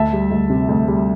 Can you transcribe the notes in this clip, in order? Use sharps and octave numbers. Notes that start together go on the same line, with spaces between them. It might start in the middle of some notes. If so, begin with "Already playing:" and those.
Already playing: D2 E5 A5
G3
D2
C3
D2
G3